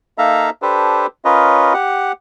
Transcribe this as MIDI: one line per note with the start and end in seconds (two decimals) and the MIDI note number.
0.18 0.50 58
0.18 0.50 63
0.18 0.50 69
0.18 0.50 76
0.18 0.50 77
0.18 0.50 82
0.62 1.07 62
0.62 1.07 67
0.62 1.07 69
0.62 1.07 71
0.62 1.07 72
1.25 1.73 61
1.25 1.73 65
1.25 1.73 70
1.25 1.73 71
1.25 1.73 73
1.25 1.73 75
1.74 2.12 67
1.74 2.12 78